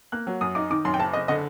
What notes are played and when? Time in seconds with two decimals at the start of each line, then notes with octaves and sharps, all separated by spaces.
0.12 A#3 F#6
0.27 F#3
0.41 F#2 D#6
0.55 D#4 D6
0.70 D#3 D6
0.85 F#2 C6
0.94 G5
0.99 F#1 A5
1.13 F#1 D#5
1.28 D3 D#5